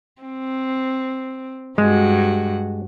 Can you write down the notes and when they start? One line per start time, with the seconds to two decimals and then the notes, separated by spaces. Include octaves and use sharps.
0.22 C4
1.78 G2 G#3 F#4